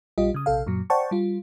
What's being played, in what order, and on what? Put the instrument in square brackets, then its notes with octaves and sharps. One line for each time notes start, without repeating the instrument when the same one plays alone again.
[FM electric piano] A#1 G3 F4 G4 D#5
C#3 D#6
A#1 C3 A4 F5
F#2 A#2 F#3
C5 D5 F#5 G5 A5 C#6
G3 F4